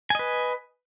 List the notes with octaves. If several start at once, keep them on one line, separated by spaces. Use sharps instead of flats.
B4 D#5 G#5